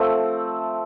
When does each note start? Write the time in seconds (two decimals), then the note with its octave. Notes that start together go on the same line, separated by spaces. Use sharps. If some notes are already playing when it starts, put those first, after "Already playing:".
Already playing: F3 A3 C4